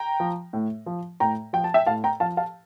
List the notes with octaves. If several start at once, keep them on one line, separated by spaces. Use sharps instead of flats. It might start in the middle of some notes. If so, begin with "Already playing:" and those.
Already playing: G5 A#5
F3
A2
F3
A2 G5 A#5
F3 G5
A5
E5 G5
A2 F5 A5
G5 A#5
F3 F5 A5
F5 A5